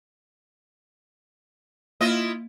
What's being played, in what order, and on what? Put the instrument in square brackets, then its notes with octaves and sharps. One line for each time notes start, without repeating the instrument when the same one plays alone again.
[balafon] A#3 [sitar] E4 F4 D#5